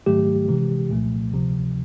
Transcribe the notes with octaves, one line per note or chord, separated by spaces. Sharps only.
G#2 D#3 F#3 A3 G4
C3 E3 G#3
C2 A#2 F3 A3
D2 C3 F3